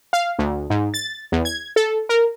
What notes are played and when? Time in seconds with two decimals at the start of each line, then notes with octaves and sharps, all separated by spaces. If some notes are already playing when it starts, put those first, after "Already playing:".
0.13 F5
0.39 D2
0.70 G#2
0.94 A6
1.32 E2
1.45 G#6
1.76 A4
2.09 A#4